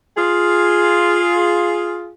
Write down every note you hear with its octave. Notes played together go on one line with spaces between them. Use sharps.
F4 G#4